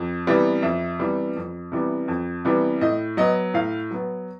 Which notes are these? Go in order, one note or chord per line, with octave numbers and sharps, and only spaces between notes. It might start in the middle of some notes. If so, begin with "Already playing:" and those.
Already playing: F2
C3 E3 G3 B3
F2 E5
C3 E3 G3 B3
F2
C3 E3 G3 B3
F2
C3 E3 G3 B3
A2 D#5
F#3 B3 D#5
A2 F5
F#3 B3